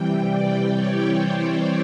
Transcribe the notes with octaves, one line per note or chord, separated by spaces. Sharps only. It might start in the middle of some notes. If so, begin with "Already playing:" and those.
Already playing: C3 E3 G3 G5
D5
C#5
C5